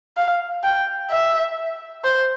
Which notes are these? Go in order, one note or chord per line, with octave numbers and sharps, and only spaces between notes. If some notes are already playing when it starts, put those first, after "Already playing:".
F5
G5
E5
C5